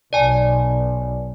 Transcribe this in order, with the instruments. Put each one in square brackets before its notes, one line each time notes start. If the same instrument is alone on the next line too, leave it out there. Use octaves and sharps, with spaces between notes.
[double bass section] B1 [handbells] D5 G#5 A5